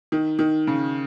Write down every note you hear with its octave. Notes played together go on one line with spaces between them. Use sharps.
D#3
D#3
C#3